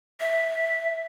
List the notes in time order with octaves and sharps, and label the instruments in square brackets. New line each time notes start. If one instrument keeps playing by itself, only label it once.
[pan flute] E5